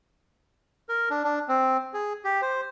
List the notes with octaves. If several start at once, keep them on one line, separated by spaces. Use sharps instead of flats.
A#4
D4
D4
C4
G#4
G4
C5